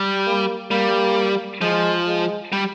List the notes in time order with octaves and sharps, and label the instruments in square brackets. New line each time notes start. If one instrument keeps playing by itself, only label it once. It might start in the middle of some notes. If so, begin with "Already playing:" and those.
Already playing: [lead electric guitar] G3
[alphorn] A#3
[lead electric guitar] G3 [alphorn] A#3
[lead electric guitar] F3 [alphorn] G#3
[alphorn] G#3
[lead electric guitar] G3